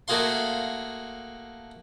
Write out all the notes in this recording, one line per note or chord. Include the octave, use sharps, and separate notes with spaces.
A3 A#3 F#4 G#4 F5 C6